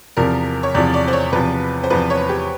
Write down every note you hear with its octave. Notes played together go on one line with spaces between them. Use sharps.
E2 C3 F3 A#4
C#5
E2 C3 F3 D5
D5
C5
C#5
E2 C3 F3 B4
C5
E2 C3 F3 B4
C#5
G4